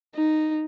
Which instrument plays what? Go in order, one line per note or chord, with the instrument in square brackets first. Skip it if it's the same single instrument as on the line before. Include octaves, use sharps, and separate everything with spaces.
[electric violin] D#4